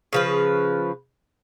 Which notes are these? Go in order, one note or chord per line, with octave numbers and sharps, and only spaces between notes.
C#3 F3 B4